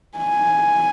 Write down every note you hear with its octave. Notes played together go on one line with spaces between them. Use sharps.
G#5